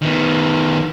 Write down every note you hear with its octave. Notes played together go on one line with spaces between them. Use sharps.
D#3 B3